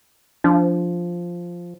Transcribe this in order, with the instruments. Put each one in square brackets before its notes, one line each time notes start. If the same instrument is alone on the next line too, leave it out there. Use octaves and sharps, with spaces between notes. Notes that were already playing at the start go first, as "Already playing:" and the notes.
[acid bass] F3 [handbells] D4